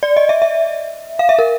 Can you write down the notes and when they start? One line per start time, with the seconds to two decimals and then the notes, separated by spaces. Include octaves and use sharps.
0.03 D5
0.17 D#5
0.29 E5
0.42 E5
1.19 F5
1.29 E5
1.39 A#4